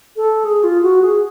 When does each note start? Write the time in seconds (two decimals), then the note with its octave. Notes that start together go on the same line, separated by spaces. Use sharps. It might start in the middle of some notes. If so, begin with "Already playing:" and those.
0.16 A4
0.44 G#4
0.63 F4
0.82 F#4
1.02 G#4